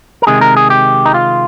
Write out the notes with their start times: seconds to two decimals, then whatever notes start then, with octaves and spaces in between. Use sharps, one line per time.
0.22 A#4
0.27 C3 D#3 G#3 G#4
0.41 A#4
0.57 G#4
0.70 G4
1.06 D#4
1.14 F4